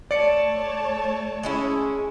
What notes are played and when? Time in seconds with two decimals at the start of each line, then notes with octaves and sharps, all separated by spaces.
0.11 A3 C#5 D5 A5 C#7
1.43 G#3 C#4 E4